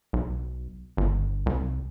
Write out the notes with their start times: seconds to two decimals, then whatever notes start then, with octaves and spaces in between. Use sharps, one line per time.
0.13 B1
0.97 G1
1.46 C2